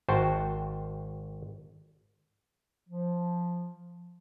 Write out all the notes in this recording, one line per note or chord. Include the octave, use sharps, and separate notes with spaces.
G#1 F#4 C5 G5 A5
F3